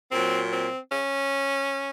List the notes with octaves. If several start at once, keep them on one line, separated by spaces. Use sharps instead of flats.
A#2 F#3 C4
C4
C#4